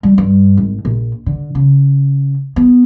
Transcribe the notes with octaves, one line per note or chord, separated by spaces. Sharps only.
G3
G2
G#1
A#1
D3
C#3
B3